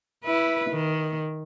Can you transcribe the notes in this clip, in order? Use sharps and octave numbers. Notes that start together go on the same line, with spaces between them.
E4 B4
D#3